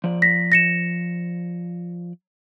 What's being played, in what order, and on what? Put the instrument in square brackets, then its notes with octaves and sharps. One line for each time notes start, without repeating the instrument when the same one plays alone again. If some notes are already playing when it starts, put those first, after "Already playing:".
[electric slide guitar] F3 D5
[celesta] A#6 B6
A#6 C#7 E7